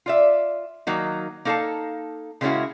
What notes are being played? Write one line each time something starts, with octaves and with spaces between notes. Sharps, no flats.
F4 D5 E5
D#3 F#3 A#3 D#4
A#3 D#4 A4 E5 F5 A5
C#3 G#3 A#3 C#4 E4 F#4